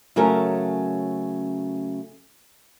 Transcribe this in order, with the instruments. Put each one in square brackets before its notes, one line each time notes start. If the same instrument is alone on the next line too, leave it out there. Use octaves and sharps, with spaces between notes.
[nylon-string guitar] C#3 F#3 A3 C#4 A4 A#4